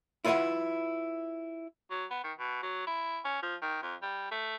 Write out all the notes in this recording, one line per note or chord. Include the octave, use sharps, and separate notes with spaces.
E4 F4 B4 C#5 E5 F#5
F#3
B3
D#3
B2
F#3
E4
C#4
F3
D#3
F2
G3
A3